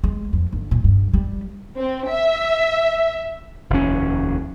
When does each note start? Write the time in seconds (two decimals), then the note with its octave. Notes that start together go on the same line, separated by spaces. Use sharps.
0.04 G#3
0.33 F2
0.52 G1
0.71 A#2
0.84 G2
1.14 G3
1.77 C4
2.08 E5
3.70 F1 D#2 C#4